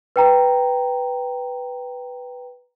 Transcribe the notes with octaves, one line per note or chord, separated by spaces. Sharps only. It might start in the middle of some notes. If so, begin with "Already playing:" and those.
B4 G5 A#5